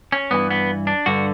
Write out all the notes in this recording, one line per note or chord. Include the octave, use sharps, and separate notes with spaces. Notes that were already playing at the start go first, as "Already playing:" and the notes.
C#4
G2 E3 B3
B3
D4
G2 D3 F#4